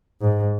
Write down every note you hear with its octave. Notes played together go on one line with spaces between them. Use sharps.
G#2